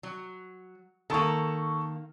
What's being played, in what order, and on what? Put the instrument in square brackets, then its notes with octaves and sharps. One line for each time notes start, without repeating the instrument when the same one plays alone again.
[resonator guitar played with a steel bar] F#3
[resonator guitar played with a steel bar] D#3 A#3 [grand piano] A4 A5 C#6